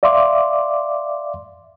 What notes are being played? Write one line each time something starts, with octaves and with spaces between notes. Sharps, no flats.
D5 E5 F5 C6 D6